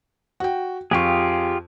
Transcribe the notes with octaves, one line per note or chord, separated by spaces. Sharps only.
F#4 G5
F2 F4 G4 G#4 C#6